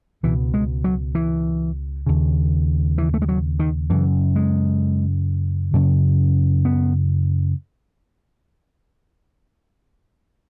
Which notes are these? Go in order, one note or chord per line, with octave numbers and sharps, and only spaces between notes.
C#2 B2 E3
G#3
F#3
E3
D#2 C#3
E3
A3
G#3
F#3
D#3
F#2 C#3 E3
G#3
F#2 C#3
B3